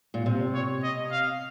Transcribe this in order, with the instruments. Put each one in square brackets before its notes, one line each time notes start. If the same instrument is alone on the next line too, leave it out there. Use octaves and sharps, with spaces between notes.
[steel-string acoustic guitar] A#2
C3
[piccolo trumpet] C#5
D#5
F5